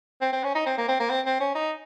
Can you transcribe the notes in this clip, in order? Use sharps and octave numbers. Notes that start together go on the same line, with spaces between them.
C4
C4
C#4
D#4
C4
A#3
C4
A#3
C4
C4
C#4
D#4